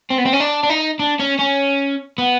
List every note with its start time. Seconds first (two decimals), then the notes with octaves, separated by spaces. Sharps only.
0.10 C4
0.18 B3
0.26 C4
0.33 C#4
0.40 D4
0.64 D4
0.70 D#4
0.99 D4
1.19 C#4
1.39 C#4
2.18 B3